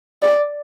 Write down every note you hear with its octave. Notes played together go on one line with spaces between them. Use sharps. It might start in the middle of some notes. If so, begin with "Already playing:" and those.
D5